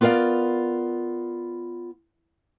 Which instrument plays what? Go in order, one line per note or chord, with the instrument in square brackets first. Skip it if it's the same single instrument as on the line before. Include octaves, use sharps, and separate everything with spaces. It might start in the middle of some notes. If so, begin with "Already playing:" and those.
[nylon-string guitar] B3 F4 A#4 D5 F5